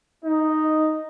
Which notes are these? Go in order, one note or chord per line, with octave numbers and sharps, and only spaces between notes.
D#4